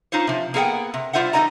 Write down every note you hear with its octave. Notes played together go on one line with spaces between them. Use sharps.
D#4 F4 C5 C#5
C3 F3
A#3 B3 G#4 D#5 F#5 G5
C3
G3 B3 F4 C5 E5 F#5
E3 G3 D#4 C#5 D#5 A#5